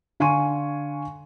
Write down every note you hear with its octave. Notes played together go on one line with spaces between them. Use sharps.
D3 F5 G#5 C6 C#6 D#7